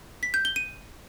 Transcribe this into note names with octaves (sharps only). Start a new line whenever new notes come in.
B6
G6
G7
D#7